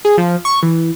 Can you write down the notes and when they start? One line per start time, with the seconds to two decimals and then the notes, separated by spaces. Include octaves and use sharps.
0.05 G#4
0.18 F3
0.45 C#6
0.63 E3